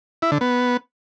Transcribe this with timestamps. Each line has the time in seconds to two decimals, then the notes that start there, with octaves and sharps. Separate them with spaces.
0.22 E4
0.32 D3
0.41 B3